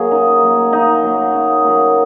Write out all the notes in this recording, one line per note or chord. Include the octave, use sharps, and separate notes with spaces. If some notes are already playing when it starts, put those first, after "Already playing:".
Already playing: F#3 A#3 G#4
C#3 D#4
F#3 A#3
C#3 D#4
F#3 A#3
C#3
F#3 A#3